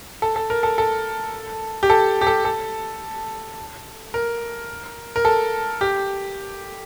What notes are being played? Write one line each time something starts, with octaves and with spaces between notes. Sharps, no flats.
A4
A4
A#4
A4
A4
G4
A4
G4
A4
A4
A#4
A#4
A4
G4